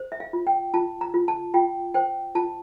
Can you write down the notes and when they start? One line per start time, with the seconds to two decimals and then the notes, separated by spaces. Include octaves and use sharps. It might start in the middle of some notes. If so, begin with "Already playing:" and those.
Already playing: C5
0.12 E5
0.20 F5
0.33 F4
0.47 G5
0.74 F4 A5
1.01 A#5
1.14 F4
1.28 A5
1.54 F4 G5
1.94 C5 G5
2.35 F4 A5